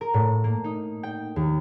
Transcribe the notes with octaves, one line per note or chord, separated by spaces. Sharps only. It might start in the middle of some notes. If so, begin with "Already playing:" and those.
A#4
A2
A#3
D#4
G5
D#2